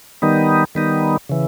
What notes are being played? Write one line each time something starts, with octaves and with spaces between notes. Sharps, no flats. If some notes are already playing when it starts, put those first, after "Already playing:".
D#3 G3 B3 D#4
D#3 G3 B3 D#4
C#3 E3